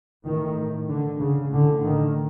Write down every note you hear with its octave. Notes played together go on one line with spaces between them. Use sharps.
A2 D#3
D3
C#3
A2 D3
D#3